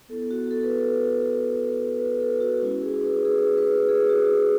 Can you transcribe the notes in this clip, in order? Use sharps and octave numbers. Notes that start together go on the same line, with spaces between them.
B3 E4 A4
F#4
A4
B4
A4
B4
A4
F#4
G#3 C#4 E4 F#4
G#4
B4
G#4
B4
G#4
F#4
G#4